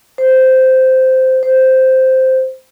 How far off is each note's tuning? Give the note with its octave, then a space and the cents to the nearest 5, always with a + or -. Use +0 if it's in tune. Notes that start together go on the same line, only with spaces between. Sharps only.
C5 -10
C5 -5